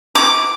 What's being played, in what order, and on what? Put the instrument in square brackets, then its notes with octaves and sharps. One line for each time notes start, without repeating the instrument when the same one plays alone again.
[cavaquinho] D6